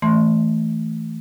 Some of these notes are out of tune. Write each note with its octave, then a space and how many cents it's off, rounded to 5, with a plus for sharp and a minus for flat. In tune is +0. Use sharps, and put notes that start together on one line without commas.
E3 -20 A3 +0 C6 +0